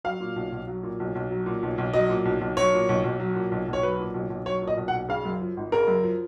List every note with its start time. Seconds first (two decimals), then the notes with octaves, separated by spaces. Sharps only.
0.04 F#3 F5
0.20 A#2
0.36 B1
0.52 B1
0.68 F#3
0.83 A#2
1.00 B1
1.15 B1
1.31 F#3
1.46 A#2
1.63 B1
1.78 B1
1.93 F#3 D#5
2.09 A#2
2.25 B1
2.41 B1
2.57 F#3 C#5
2.73 A#2
2.89 B1
3.04 B1
3.20 F#3
3.35 A#2
3.52 B1
3.68 B1
3.73 C#5
3.83 F#3 B4
3.99 A#2
4.14 B1
4.30 B1
4.46 F#3 C#5
4.62 A#2
4.68 D#5
4.77 B1
4.88 F#5
4.93 B1
5.09 C#3 F5
5.25 F#2
5.41 F3
5.57 G#1
5.72 C#3 A#4
5.88 F#2
6.03 F3